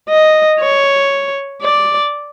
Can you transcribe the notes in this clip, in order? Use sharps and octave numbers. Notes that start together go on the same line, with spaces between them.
D#5
C#5
D5